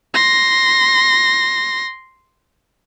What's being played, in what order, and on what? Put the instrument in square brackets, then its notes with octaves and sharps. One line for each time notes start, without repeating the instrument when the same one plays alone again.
[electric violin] C6 A#6